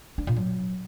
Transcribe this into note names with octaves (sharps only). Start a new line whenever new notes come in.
D4
A#2
F#3